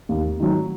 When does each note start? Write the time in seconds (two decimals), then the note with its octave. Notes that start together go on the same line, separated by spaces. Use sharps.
0.09 D#2
0.40 D#3 F#3